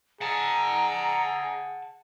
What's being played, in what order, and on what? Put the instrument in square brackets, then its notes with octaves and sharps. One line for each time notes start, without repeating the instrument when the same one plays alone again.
[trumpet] G#4 [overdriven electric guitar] F#5 A5 [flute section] A#5